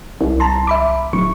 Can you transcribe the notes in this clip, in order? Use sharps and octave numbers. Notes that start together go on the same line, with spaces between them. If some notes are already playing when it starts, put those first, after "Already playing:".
C2
A5 A#5 C6
E5 B5 D6
D1 C#6